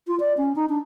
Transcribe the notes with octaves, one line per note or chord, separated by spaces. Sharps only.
F4
D5
C#4
D#4
D4